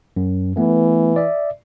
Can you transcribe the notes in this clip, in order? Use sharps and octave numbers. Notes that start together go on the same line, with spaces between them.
F#2
E3 A3 B3
D5 E5